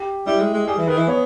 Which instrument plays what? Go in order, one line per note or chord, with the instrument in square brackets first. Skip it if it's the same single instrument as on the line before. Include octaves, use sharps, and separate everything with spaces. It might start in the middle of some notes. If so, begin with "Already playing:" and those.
Already playing: [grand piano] G4
[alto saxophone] G3 [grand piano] E4
[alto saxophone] G#3
G#3
[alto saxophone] G3 [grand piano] G#4
[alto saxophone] E3
[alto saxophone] D#3 [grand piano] B4
[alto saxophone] E3
[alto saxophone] B3 [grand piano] C#5